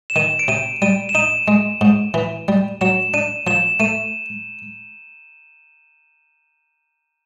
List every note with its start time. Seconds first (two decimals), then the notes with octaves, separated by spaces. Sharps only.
0.10 E7
0.16 D#3 D#7
0.39 D7
0.48 C3 D#7
0.82 G3 D#7
1.09 E7
1.15 D#4 D#7
1.48 G#3
1.81 G#2
2.14 E3
2.48 G3
2.81 F#3 E7
3.14 D4 D#7
3.47 F3 E7
3.80 A3 D#7